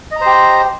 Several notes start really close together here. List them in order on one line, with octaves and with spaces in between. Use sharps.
D#5 A#5 C5 G4